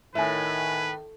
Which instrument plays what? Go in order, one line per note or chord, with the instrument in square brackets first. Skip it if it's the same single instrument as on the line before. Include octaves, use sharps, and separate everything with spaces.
[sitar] A2 [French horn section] D#3 [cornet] B4 [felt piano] E5 G#5